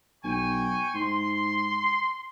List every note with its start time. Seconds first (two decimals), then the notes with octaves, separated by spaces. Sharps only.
0.24 B1 G5 G#5 C#6
0.95 G#2 C6